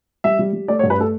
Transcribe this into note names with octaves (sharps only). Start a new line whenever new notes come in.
G3 E5
G3
G3
A3 D5
C#5
G2
B4
A3 A4